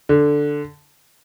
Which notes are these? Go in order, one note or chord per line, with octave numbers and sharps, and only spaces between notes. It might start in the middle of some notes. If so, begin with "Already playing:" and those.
D3